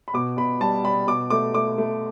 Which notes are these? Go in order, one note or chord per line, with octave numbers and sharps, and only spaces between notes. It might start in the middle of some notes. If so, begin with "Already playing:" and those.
B5
B2 D6
B2 B5
G3 A5
G3 B5
B2 D6
A3 D6
A3 D6
A3